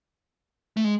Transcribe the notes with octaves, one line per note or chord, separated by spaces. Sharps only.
A3
G#3